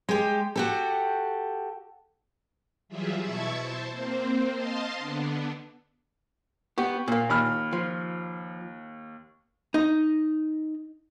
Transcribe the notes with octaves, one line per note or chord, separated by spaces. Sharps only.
G#3 G4
F#4 G4 A4
E3 F#3 G3 F4 G#4 E5
B2 E4 E5 A5 C#6 G#6
C5 A5
A#3 C4 C5
D#5 F5 A5 C6
D3 B3 D4
B3 G4 C#6
A#2 A#3
D#2 B5 F6
F3
D#4